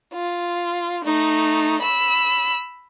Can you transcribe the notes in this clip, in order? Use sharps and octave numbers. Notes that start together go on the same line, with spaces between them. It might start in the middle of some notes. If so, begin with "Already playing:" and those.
F4
A3 D#4
B5 E6